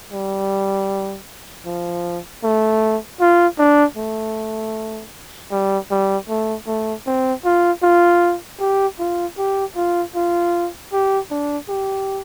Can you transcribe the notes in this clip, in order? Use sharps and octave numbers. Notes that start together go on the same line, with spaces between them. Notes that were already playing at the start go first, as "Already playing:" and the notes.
G3
F3
A3
F4
D4
A3
G3
G3
A3
A3
C4
F4
F4
G4
F4
G4
F4
F4
G4
D4
G4